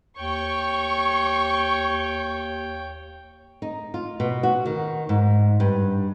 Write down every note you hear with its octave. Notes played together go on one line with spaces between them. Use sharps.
D#2 C#5 G5 C#6
D#4
F4
B2
F#4
D#3
G#2
G2